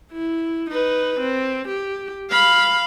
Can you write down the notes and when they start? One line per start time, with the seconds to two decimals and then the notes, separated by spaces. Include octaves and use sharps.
0.11 E4
0.70 D#4 B4
1.20 C4
1.68 G4
2.30 F5 B5